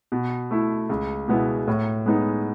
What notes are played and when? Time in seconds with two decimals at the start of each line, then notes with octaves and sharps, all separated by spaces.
0.12 B2
0.51 A3 E4
0.89 C#2
1.28 B2 G#3 B3 E4
1.68 A2
2.06 G#3 B3 D#4